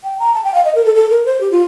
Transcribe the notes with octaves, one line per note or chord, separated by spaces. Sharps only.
G5
A#5
A5
G5
F5
D#5
A#4
A4
A4
A#4
C5
G4
F4